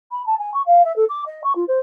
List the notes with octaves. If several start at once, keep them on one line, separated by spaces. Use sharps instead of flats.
B5
A5
G#5
C#6
F5
E5
A4
D6
D#5
C#6
F4
C5